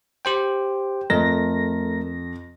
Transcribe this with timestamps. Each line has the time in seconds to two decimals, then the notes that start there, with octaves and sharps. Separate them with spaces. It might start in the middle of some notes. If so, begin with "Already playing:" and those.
0.25 G4 C5 G5
1.10 F2 A3 A#4 A#6